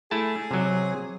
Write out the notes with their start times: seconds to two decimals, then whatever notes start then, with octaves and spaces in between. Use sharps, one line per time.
0.11 A3 E4 G#4 A5
0.51 C3 F#3